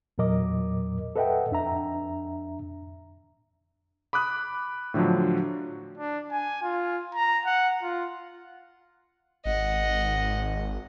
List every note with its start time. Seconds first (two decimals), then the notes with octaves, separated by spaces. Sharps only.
0.18 E2 A#2 F#3 A#4 D#5 D6
1.16 A4 B4 D#5 E5 F#5 G5
1.51 F2 D4 E5 A#5
4.13 B5 D6 D#6 F#6
4.94 A2 D3 F3 F#3
5.97 D4
6.31 G#5
6.62 F4
7.14 A#5
7.45 F#5
7.82 F4
9.45 G#1 D#5 F#5